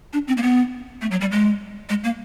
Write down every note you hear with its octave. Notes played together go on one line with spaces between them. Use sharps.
D4
C4
A#3
B3
A3
F#3
G3
G#3
G#3
A#3